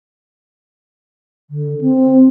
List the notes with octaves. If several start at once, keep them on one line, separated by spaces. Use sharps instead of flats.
D3
C4